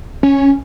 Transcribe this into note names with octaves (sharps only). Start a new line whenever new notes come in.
C#4